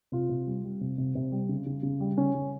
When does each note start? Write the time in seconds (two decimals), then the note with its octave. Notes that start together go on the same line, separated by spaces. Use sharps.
0.12 C3 F4
0.29 C3
0.47 G3
0.64 G3
0.81 C3
0.98 C3
1.15 C3
1.32 G3
1.49 C#3
1.66 C#3
1.83 C#3
2.00 G3
2.17 C#3 C#4
2.35 C#3